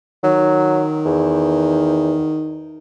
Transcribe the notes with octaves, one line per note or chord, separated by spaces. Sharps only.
D#3 F#3
E2